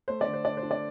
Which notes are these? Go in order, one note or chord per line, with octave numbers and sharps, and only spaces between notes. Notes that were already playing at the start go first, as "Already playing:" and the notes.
A3 C5
D5
D3
C5
D4 D5
C5
D4
D5